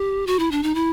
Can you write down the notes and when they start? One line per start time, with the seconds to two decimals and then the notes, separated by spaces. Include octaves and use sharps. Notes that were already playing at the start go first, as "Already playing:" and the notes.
Already playing: G4
0.27 F#4
0.39 E4
0.51 D4
0.63 D#4
0.75 E4